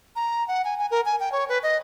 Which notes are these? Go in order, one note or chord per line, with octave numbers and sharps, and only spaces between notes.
A#5
F#5
G#5
G#5
A#4
G#5
G5
C#5
B4
D#5